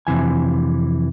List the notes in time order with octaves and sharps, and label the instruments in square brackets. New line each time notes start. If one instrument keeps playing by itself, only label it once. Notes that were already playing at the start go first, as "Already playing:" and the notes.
[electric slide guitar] F2 C3 E3 G#5